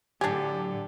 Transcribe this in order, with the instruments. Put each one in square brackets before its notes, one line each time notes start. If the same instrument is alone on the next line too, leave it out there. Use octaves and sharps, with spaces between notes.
[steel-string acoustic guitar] A2 F#3 [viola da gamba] D3 A4 [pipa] D4 G#5 [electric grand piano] G4